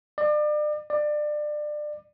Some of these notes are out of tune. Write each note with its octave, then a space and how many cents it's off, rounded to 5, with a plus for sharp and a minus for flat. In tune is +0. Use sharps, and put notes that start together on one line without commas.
D5 +35
D5 +25